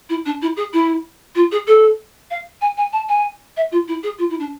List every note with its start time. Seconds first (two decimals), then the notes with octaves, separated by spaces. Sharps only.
0.09 E4
0.25 D4
0.42 E4
0.56 G#4
0.73 E4
1.35 F4
1.51 G#4
1.67 A4
2.30 F5
2.61 G#5
2.77 G#5
2.92 A5
3.08 G#5
3.56 E5
3.71 F4
3.88 E4
4.03 G#4
4.18 F4
4.30 E4
4.39 D4